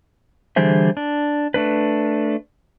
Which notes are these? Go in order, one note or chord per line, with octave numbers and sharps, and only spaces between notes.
D3 E3 G3 G#4 C5 E5
D4
A3 D4 B4